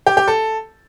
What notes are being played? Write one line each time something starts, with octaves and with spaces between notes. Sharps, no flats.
G4
G4
A4